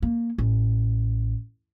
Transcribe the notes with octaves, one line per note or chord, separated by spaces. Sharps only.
A#3
A1